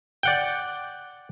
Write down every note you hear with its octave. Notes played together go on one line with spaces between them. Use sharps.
D5 F#5 G5